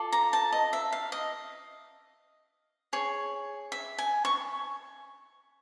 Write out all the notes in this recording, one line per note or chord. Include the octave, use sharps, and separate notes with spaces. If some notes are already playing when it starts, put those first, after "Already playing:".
Already playing: F4 A4 D5
A#5
A5
D#5
E5
F5
D#5
G#4 C#5
E5
G#5
C#6